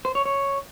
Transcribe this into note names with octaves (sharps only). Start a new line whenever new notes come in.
C5
C#5
C#5